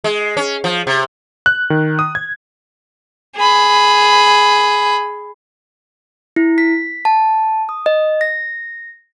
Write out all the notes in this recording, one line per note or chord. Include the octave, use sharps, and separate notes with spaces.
G#3
C#4
F3
C3
F#6
D#3
D#6
G#6
G#4 B5
E4
B6
A5
D#6
D#5
A#6